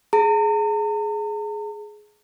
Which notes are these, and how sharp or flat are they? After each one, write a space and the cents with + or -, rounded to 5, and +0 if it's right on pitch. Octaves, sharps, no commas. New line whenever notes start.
G#4 +15 A#5 -45